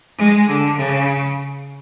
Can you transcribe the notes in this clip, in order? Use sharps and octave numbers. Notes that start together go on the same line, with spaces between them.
G#3
D3
C#3